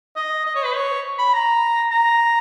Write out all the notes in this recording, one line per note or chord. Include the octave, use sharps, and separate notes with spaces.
D#5
D#5
C#5
B4
C#5
B5
A#5
A#5